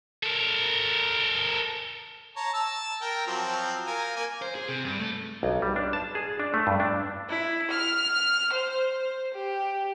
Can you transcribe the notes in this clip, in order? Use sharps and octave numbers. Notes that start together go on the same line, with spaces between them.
A4 A#4
C#5 A5 A#5
A5 E6
A#4 G5
F3 F#3 C4
F4 A#4 G#5
A#3 G#5
C5
G#4
C3
G2
A3
B1
G3
D4
A5
G#4
D4
A3
G2
D4
E4
F6
C5
G4